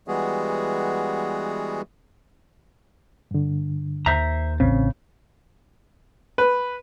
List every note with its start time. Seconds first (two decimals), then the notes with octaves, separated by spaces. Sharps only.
0.08 E3 G3 G#3 B3 F#4 G#4
3.31 G2 D3
4.06 D#2 C5 E5 A#5
4.60 A1 C#3 C4
6.38 B4